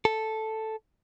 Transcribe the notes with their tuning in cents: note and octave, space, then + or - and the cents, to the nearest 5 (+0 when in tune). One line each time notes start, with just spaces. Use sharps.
A4 +0